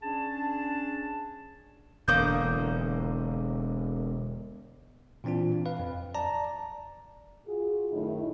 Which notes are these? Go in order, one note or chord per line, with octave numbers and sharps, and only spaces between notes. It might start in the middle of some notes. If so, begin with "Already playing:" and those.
C#4 D4 G#4 A5
E1 D3 A#3 D#6 G6
A#2 E3 C4 D4 F4
B4 F5
F2
D5 A5 A#5
F4 F#4 G#4
F#2 A2 D#3 D#4 E4